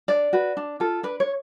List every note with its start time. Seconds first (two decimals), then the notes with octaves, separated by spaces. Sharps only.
0.08 D4 D5
0.33 F#4 B4
0.57 D4
0.80 F4 A4
1.03 D4 B4
1.20 C#5